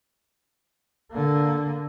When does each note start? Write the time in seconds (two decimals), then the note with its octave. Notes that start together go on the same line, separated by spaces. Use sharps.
1.12 D3 A#3